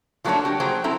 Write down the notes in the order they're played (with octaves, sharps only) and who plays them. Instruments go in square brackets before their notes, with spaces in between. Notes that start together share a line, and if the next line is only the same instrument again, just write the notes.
[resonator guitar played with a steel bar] F3 F#3 A3 A#3 D4 C#5
F#4 G4
F#3 A#3 G#4 C5 G5
C4 E4 A4 A#5